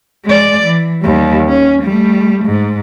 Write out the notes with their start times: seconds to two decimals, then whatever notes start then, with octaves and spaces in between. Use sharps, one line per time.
0.25 G#3 D5
0.65 E3
1.02 D#2 G3
1.49 C#4
1.83 G3 A3
2.45 G#2